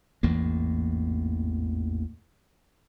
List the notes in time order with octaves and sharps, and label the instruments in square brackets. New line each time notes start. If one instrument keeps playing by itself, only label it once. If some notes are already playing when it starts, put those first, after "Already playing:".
[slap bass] A1 E2 G#2 A#3